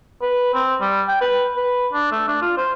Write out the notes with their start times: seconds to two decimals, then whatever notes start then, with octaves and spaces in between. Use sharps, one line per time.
0.22 B4
0.54 C4
0.81 G3
1.08 G5
1.21 B4
1.56 B4
1.93 D4
2.12 A3
2.28 D4
2.42 F4
2.57 C5